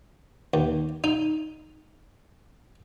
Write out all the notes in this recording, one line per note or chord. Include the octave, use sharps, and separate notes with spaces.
D#2
D#4